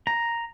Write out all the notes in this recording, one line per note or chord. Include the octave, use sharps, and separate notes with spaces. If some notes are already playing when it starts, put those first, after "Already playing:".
A#5